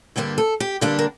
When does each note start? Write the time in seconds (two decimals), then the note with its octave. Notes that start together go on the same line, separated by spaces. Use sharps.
0.16 G2 D3 G3 A#3 D4 G4
0.38 A4
0.60 G4
0.81 G2 D3 G3 A#3 D4 G4
0.99 A#4